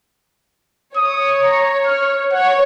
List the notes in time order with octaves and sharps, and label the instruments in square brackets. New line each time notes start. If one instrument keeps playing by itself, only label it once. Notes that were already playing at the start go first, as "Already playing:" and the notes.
[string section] C#5 [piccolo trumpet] D#6
[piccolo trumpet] A#5
F6
[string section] C#5 [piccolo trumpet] F#5